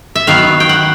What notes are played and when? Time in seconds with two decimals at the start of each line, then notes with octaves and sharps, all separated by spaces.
0.16 E5
0.27 D#3 F#3 B3 F5
0.60 G5
0.69 F#5